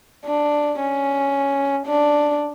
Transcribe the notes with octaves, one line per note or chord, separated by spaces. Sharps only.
D4
C#4
D4